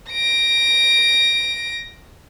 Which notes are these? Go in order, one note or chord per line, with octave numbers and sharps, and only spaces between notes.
A#6 D7